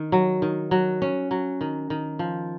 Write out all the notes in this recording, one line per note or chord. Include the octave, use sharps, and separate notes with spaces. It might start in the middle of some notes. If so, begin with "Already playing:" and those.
Already playing: D#3
F#3
D#3
F#3
C#4
F#3
D#3
D#3
F3